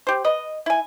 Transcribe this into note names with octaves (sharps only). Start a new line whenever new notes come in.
G4 C5
B4 D#5
E4 G#5